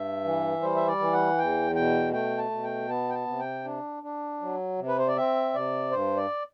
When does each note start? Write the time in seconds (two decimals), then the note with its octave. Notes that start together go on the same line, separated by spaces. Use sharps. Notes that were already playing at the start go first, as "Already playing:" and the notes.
Already playing: G2 E5
0.24 E3
0.61 G3 C5
0.76 E5
0.88 D5
0.99 E3
1.13 F#5
1.38 E2 G5
1.75 B2 G5
2.13 A3 G5
2.38 A5
2.51 B2
2.63 G5
2.89 B3 A5
3.09 G5
3.14 A5
3.27 C3
3.39 G5
3.64 D4
4.03 D4
4.41 F#3
4.79 C3
4.88 B4
4.98 C5
5.08 D5
5.16 C4 E5
5.54 C3 D5
5.91 G2 C5
6.17 D5